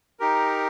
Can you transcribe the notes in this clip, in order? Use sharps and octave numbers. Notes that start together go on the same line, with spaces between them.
D#4 G4 A#4